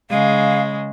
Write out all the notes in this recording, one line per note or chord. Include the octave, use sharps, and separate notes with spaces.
C#3 G#3 F5